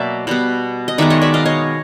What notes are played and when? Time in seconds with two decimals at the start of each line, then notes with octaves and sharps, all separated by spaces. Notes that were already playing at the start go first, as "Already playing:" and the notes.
Already playing: B2 F#3 A#3 D5 E5
0.27 B2 G3 B3
0.88 D#5
0.98 D#3 G#3 B3 D5 E5
1.10 C#5 D#5
1.21 D5 E5
1.34 D#5 F5
1.46 C#5 D#5